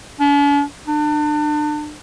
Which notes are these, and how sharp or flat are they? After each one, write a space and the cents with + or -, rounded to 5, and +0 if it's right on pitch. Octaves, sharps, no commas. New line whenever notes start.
D4 -45
D4 +35